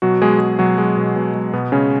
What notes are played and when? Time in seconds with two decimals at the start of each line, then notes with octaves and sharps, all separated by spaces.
0.02 B2 F#3 F#4
0.21 B2 G#3 G#4
0.40 G#3
0.59 B2 F#3 F#4
0.78 G#3
0.97 B2
1.16 B2
1.34 G#3
1.53 B2 B3
1.72 C#3 G#3 C#4